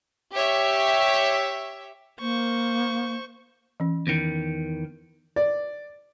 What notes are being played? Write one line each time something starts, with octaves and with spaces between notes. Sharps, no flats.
G4 C#5 E5
A#3 C5 C#6
E3 C#4
E2 D#3
D5